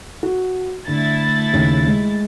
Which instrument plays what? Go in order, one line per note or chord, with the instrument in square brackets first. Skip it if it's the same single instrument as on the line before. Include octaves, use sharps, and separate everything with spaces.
[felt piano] F#4
[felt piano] D3 [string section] A3 E4 A6
[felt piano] D#2 C#3
G#3